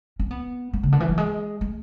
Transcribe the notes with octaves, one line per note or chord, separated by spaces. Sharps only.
C#4
B3
A3
C#3
D3
E3
F#3
G#3
A3